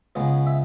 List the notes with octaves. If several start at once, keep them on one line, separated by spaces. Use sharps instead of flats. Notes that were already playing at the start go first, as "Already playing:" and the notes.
C#2 C#3 G#3 B3
E5